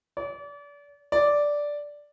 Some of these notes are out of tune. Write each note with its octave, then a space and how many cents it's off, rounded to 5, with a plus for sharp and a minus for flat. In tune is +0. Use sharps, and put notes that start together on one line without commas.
D5 -35
D5 -5